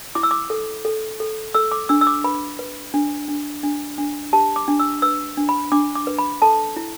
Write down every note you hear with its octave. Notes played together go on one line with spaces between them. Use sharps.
E4 D6
E6
D6
A4
A4
A4
A4 E6
D6
D4 E6
E6
D6
B4 B5
B4
D4
D4
D4
D4
G4 A5
D6
D4
E6
B4 E6
D4
B5
D4 D6
D6
B4
B5
A4 A5
E4